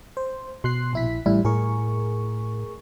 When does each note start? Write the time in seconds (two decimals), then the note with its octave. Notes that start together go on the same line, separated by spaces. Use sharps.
0.17 C5
0.64 B2 C6 F#6 C7
0.93 A#1 E4 B6
1.26 A1 A2 G3 E4
1.45 A2 G#4 A#4 C#6